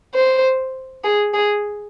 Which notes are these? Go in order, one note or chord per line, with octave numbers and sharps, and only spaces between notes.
C5
G#4
G#4